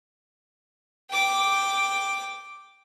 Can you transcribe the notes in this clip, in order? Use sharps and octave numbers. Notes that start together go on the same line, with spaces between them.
G5 D6